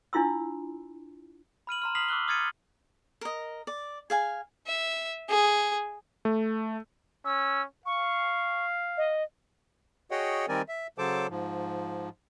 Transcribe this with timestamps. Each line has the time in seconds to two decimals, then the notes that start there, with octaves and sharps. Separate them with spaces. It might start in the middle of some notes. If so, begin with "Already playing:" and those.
0.13 D4 E4 F4 C6 E6
1.67 B5 F6 D#7 F#7
1.82 A#5 C6 F6
1.95 D#6 F6 B6 C7 F7 F#7
2.08 D6 E6 F#6 G7
2.28 D#6 F6 G#6 A6 C#7 D#7
3.21 A#4 D#5
3.67 D5
4.10 G#4 F5 G#5
4.67 E5
5.29 G#4
6.25 A3
7.25 C#4 E6
7.86 F5 C#6
8.97 D#5
10.11 F#4 G#4 C#5 D#5 F#5 G5
10.48 D#3 G3 C4 A#4 D5 G#5
10.68 E5
10.98 C#3 F#3 A4 C5 A5 D6
11.30 G#2 F3